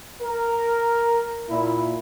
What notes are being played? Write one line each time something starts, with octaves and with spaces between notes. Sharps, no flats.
A#4
A#2 E4